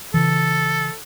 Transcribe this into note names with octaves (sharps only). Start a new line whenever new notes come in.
C#3 E3 A4